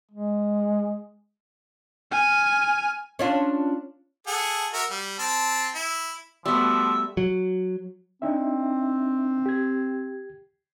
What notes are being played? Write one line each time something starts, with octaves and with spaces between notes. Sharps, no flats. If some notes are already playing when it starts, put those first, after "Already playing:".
G#3
G#5 F6
C#4 D4 F4
G#4 A4 F#5
F#4 A#4 E5
G3
C4 A5
E4
F3 G3 A3 B3 F#4 E5
F#3
C4 D4 D#4 E5
G4 G#6